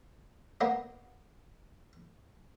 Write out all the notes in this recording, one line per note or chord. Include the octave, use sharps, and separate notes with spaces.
A#3 B3 D#5